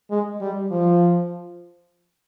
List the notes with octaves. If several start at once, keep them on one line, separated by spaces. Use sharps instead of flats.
G#3
G3
F3